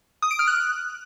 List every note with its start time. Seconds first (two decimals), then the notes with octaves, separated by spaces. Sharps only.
0.22 D#6
0.31 D7
0.39 F6
0.47 F#6